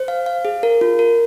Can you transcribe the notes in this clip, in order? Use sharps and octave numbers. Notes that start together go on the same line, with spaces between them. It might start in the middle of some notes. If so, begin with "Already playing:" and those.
Already playing: C5
F5
F5
G#4
A#4
F4
A#4